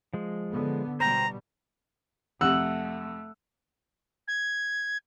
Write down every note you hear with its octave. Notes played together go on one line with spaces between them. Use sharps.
F3 G#3
D3 B3
B2 G3 C5 G5 A#5
F2 C3 A3 F#5 E6
G#6